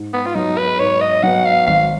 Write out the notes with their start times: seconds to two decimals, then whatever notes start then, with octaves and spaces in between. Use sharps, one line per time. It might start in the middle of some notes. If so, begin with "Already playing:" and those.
Already playing: G#2
0.14 B3
0.26 F4
0.35 F#3 B3 D#4
0.58 B4
0.79 G#2 C#5
1.01 D#5
1.23 F#3 B3 F#5
1.45 F5
1.67 G#1 F5